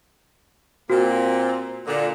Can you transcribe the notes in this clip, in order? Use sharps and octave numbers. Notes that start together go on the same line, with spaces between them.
A#2 A#3 C4 F#4
A#2 D3